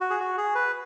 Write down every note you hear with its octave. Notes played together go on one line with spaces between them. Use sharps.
F#4
G#4
F#4
G#4
B4